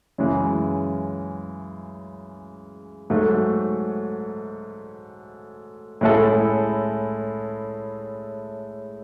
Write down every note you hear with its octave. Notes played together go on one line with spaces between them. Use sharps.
F#2 C#3 E3 G#3
G#2 F#3 A3
A2 G#3 C#4 E4 A4